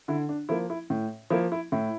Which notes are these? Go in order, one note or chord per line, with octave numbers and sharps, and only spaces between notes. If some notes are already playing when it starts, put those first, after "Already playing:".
D3 E4
D4
F3 A#3 E4
E4
A2
F3 A#3 E4
E4
A2 E4